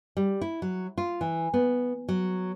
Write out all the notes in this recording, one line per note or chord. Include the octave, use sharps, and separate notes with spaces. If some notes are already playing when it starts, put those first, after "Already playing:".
G3
E4
F#3
F4
E3
B3
F#3